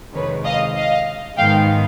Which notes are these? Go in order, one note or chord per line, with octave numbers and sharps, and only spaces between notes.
F2 C3 D#3 G#3 B4 C#5
D#5 F5
D#5 F5
G#2 D#3 G#3 B3 F5 G5